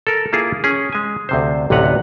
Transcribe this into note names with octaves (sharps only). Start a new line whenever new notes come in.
A4 A#4
A#3 E4 F4 G#4
C#4 G#4
G#3 G#5
D2 C3 C5
A1 D2 C3 B4 F#5 A#5